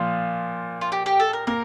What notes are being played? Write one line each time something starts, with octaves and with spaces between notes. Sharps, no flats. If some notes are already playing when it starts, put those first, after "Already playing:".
Already playing: A#2 F3 F4
F4
G4
G4
A4
A#4
A#3 A#4